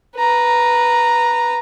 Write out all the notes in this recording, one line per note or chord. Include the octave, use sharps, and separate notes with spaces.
B4 A#5